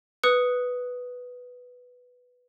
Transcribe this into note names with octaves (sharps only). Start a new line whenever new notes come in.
B4 D#6 F#6 C#7